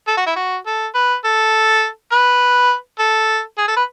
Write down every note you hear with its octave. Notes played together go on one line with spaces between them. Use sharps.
A4
F#4
E4
F#4
A4
B4
A4
B4
A4
G#4
A4
B4